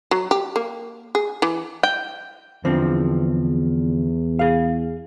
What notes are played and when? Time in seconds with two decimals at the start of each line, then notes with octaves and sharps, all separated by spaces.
0.11 F#3
0.31 G4
0.56 A#3
1.15 G#4
1.42 E3
1.83 G5
2.65 E2 D3 F3 C4
4.39 G#4 F5